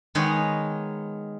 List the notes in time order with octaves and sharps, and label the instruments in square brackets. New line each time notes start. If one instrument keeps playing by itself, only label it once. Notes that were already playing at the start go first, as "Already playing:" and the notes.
[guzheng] D#3 G#3 B3 D#4 G#4 C#5